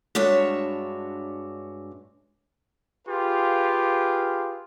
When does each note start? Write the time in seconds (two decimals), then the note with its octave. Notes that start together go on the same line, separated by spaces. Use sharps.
0.15 G2 G#3 D4 F#4 C#5 E5
3.08 F4 G4 G#4 B4 F5